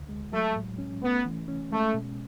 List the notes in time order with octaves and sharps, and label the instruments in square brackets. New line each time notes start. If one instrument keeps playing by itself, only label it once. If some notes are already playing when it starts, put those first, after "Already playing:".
Already playing: [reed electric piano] D2 D3
G#3
[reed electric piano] F#3 [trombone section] A3
[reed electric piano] A2
C#4
[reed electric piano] A3 [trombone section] B3
[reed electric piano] E3
C#4
[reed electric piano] G#3 [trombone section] A3
[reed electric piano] B2